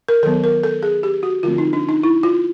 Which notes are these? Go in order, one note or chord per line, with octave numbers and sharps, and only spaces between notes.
A#4
D#3 F#3 B3 A4
A#4
A4
G#4
G4
F#4
D3 F3 A3 C4 F4
D#4
D4
D#4
E4
F4